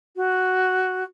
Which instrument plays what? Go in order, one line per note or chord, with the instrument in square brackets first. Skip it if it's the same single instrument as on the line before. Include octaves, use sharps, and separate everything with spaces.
[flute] F#4